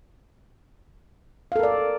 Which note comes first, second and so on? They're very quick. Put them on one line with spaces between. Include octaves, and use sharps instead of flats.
F5 A4 A#4 D5